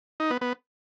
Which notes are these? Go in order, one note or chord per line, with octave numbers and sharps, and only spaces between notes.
D#4
B3
B3